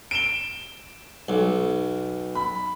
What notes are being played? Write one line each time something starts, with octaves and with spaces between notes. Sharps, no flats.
D7 E7 G7
B1
B5